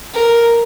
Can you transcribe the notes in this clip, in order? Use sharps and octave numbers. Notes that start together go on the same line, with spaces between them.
A#4